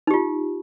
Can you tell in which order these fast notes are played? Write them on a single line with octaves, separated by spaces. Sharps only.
D#4 G4 F4